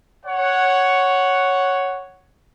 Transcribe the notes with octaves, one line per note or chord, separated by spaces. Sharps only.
C#5 F#5